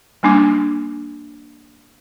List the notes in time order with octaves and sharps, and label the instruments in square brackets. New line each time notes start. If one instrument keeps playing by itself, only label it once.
[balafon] G3 A#3 D4 G#5 D6